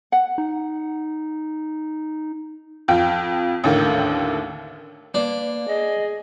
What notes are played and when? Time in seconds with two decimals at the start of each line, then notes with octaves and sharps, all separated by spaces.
0.12 F#5
0.38 D#4
2.88 F2 F5 G5
3.64 A1 D#2 D3 D#3
5.14 A#3 D4 B4
5.68 G#4 D#5